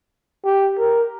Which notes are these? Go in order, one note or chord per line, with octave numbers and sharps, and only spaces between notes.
G4
A#4